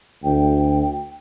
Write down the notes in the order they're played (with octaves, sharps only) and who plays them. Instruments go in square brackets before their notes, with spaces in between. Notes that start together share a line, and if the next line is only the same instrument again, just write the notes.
[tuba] D2 [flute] G5